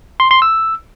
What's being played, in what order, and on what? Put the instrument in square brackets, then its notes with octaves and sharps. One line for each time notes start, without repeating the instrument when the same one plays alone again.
[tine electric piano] C6
C6
E6